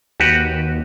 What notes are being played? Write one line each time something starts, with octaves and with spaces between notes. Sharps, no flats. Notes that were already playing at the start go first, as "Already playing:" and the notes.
D#2 F#4 G4 B4